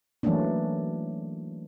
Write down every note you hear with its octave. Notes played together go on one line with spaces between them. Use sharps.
E3 F#3 A3 A#3 C#4 D4